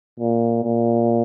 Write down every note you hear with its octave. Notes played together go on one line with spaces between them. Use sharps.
A#2
A#2